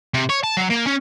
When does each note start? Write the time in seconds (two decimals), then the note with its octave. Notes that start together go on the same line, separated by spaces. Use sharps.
0.14 C3
0.29 C#5
0.43 A5
0.57 F#3
0.70 A#3
0.87 C#4